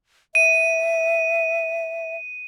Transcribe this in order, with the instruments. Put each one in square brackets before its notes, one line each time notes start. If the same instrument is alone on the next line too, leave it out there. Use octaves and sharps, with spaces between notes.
[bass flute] E5 [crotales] D#7